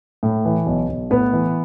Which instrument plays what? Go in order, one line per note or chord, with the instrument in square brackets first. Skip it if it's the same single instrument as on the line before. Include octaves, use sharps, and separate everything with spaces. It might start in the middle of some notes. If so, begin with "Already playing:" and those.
[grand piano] A2
E3
B1
B1
A2 B3 B4
E3